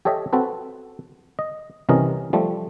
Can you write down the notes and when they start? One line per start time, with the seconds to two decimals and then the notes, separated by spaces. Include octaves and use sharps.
0.05 G4 A4 C#5 D#5 E5
0.33 C4 F#4 A4 B4
1.39 D#5
1.89 C2 C3 E3 C#4 A#4 D#5
2.33 F3 G3 A3